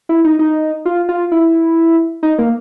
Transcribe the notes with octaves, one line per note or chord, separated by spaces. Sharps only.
E4
D#4
D#4
F4
F4
E4
D#4
A#3